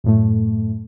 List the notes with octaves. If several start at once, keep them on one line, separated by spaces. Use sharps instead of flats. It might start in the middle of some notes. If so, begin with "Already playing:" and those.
F#2 A2 A3